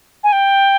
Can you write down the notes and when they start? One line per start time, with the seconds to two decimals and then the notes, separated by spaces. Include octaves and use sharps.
0.24 G#5
0.32 G5